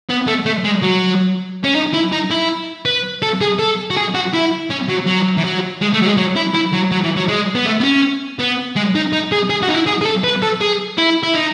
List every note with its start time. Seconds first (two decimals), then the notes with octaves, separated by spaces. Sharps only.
0.09 B3
0.27 A3
0.46 A3
0.64 G#3
0.82 F#3
1.64 C#4
1.75 D#4
1.93 E4
2.12 D#4
2.30 E4
2.85 B4
3.22 A4
3.41 G#4
3.59 A4
3.90 F#4
3.97 G#4
4.15 F#4
4.34 E4
4.71 C#4
4.89 F#3
5.07 F#3
5.37 E3
5.44 F#3
5.81 G#3
5.93 A3
6.01 F#3
6.06 G#3
6.17 F#3
6.36 E4
6.55 E4
6.73 F#3
6.92 F#3
7.04 E3
7.16 F#3
7.28 G#3
7.55 B3
7.66 A3
7.80 B3
7.84 C#4
8.39 B3
8.76 G#3
8.95 D#4
9.13 D#4
9.32 G#4
9.50 G#4
9.63 F#4
9.69 D#4
9.74 E4
9.87 G#4
10.02 G#4
10.05 A4
10.24 B4
10.42 A4
10.61 G#4
10.98 E4
11.23 E4
11.34 D#4